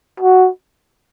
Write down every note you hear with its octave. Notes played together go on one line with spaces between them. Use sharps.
F#4